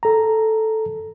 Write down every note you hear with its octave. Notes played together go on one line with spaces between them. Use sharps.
A4 A#5